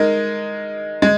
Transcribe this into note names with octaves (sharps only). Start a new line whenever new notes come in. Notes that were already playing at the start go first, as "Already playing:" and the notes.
Already playing: G#3 D#4 A#4
G#3